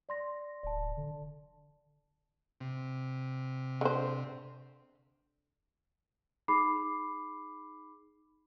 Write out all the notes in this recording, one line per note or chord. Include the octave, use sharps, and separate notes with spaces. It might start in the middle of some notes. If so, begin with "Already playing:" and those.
D5 C6 A#6
D1 D5 A5
D3
C3
D3 C5
D#4 G#4 B5 D6 C7